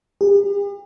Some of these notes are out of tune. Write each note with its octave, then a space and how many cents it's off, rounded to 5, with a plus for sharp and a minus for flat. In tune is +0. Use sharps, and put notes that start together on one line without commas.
G4 +45